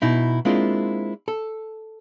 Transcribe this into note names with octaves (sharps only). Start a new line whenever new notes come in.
B2 D#4 E4
G#3 A#3 C4 D4 E4 F4
A4